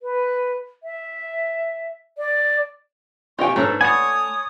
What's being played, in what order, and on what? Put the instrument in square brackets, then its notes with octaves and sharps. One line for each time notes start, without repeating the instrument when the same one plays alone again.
[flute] B4
E5
D5
[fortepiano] C3 G4 G#5 [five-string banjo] F4 D#5 G5 [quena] C#6
[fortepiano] G#2 D4 A#5 [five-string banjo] A3 C#4 B4 [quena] A4
[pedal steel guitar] C#5 G#5 [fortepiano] D5 F#5 B5 [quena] D#6